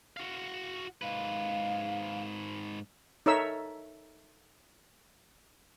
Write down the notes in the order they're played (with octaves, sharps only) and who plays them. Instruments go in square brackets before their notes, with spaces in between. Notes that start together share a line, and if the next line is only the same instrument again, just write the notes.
[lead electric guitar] F#4 F5
[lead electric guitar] G#2 B4 [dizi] F5
[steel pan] D#4 A4 A#4 C#5 E5 E6